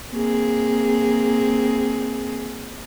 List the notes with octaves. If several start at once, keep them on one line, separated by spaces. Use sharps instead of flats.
A#3 C4 G#4